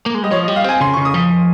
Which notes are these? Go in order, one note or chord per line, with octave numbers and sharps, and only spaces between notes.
A#3
G#3
G3 D#5
F3 C#5
D#5
G3
F5
C4 G#5
C#3 C6
C#3 C#6
D#6
F3